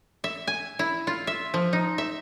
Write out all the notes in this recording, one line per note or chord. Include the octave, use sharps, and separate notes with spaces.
E5
G#5
E4
F4
E5
F3
D#4
E5